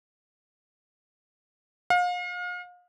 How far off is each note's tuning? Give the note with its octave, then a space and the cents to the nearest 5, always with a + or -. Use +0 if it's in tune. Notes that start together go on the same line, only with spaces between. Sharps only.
F5 +35